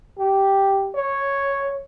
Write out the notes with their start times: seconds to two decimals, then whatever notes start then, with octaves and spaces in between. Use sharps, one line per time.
0.18 G4
0.95 C#5